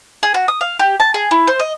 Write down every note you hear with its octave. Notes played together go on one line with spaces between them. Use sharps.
G#4
F#4
D#6
F5
G4
A5
G#4
E4
C5
D#5